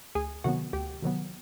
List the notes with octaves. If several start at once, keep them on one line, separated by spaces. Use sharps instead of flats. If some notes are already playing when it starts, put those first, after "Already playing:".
D2 G#4 G#5
C3 D#3 F#3 B3 F#4 F#5
D2 G4 G5
C3 D#3 F#3 B3